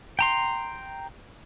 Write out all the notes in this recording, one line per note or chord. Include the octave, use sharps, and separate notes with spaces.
G5 A#5 C6